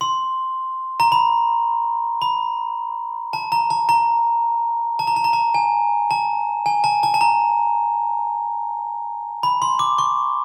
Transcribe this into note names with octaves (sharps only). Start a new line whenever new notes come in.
C6
A#5
B5
B5
A5
A#5
A5
A#5
A5
A#5
A5
A#5
A5
G#5
A5
G#5
A5
A5
A5
A#5
B5
C6
D6
C#6